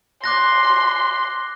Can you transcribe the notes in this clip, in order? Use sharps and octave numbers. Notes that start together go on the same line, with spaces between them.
C6 D6 F#6 A#6